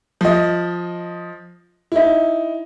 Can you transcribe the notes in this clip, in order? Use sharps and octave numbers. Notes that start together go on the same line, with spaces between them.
F3 D#5
D#4 E4